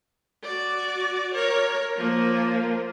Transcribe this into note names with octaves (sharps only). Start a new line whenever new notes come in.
F#4 D5
A#4 C#5
F3 A#3